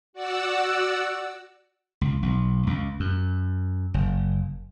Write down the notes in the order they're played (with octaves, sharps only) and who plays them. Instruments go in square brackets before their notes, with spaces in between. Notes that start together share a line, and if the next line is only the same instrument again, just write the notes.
[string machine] F#4 D5 F#5 E6
[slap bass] C#2
B1
C#2
F#2
F#1